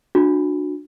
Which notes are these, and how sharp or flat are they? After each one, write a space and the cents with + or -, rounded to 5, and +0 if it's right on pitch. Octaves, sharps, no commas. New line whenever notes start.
D4 +15 F#4 -25